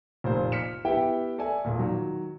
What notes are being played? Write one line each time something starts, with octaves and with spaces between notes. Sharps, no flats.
F1 A#2 C5
F6 B6 C#7 E7
B3 E4 G4 E5 G5
A4 D5 E5 G#5
E1 A#2
D#3 F#3